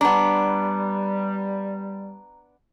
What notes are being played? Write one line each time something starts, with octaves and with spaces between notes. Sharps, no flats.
G3 B3 D4 A#5